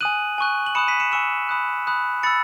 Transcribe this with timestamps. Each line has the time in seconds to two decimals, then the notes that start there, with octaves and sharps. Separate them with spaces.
0.01 G#5 D#6 F#6 D#7 F#7
0.38 G#5 C#6 F#6
0.66 F#7
0.75 B5 D#6 F#6 C#7 E7
0.87 B6 D#7
1.00 C#7 E7
1.12 G#5 C#6 E6 C#7 E7
1.49 B5 D#6 F#6
1.87 B5 D#6 F#6
2.23 B5 E6 A6 C#7